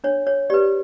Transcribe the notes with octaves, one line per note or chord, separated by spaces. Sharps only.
D4 C#5
C#5
G4 B4 D5